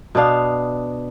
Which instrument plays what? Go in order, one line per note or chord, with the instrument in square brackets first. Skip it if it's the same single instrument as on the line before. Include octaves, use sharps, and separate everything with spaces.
[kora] B2 B3 D4 F5